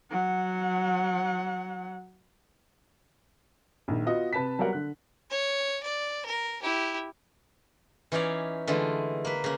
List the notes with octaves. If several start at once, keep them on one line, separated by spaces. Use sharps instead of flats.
F#3 F#5
A#1 D#3
B3 F4 F#4 D#5
C3 B4 A5 B6
F#3 G3 B3 A#4 F#5
D3 F#6
C#5
D5
A#4
E4 G4
E3 C#4 D#4 C#5 D5 F5
D3 E3 G#3 A3 F4
A#3 B4
C#3 A#3